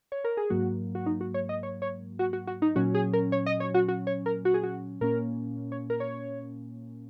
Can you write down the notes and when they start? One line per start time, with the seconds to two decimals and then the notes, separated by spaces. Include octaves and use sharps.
0.12 C#5
0.24 A#4
0.37 G#4
0.50 G#2 F#3 A#3 F#4
0.95 F#4
1.06 D#4
1.21 F#4
1.34 C#5
1.49 D#5
1.63 C#5
1.82 C#5
2.19 F#4
2.33 F#4
2.47 F#4
2.62 D#4
2.76 A#2 F#3 C#4 F#4
2.94 G#4
3.13 A#4
3.32 C#5
3.46 D#5
3.60 C#5
3.74 F#4
3.88 F#4
4.07 C#5
4.26 A#4
4.45 F#4
4.54 G#4
4.63 F#4
5.01 A#2 A#3 C#4 A#4
5.72 C#5
5.90 A#4
6.00 C#5